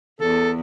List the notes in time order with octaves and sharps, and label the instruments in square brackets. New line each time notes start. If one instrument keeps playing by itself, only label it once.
[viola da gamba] E2 [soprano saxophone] A4